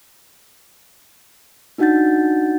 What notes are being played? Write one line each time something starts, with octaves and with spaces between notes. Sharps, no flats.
D4 D#4 F#4 F#5 G6 A6